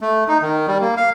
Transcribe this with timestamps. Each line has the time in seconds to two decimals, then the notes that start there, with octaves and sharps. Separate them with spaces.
0.01 A3
0.28 D#4
0.42 D#3
0.68 G3
0.82 A#3
0.97 F5